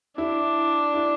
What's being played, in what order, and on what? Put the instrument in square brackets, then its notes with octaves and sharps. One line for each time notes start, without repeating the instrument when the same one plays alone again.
[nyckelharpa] D4 [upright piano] E4
[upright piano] E4